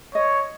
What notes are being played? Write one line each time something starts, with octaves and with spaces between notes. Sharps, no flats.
C#5 D#5